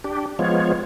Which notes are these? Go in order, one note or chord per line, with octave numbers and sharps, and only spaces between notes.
D4 G4
F3 G#3 B3 F4 C#5